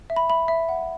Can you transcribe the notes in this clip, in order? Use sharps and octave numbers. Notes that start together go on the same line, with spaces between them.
E5
B5
E5 B5
E5
F#5